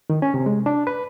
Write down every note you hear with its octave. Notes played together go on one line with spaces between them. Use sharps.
D#3
C#4
C3
G#3
D4
B4